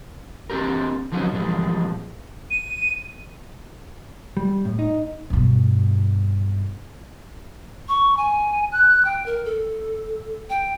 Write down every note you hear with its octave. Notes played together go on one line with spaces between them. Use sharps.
C4 D4 D#4 G4 A#4
D3 F3 F#3 B3 C#4 D#4
A#2 E3 F3 G3 G#3
D#7
G3
A2
D#4
G2 B2
C#6
G#5
F#6
G5
A#4
A4
G5